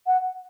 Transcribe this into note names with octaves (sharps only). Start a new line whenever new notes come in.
F#5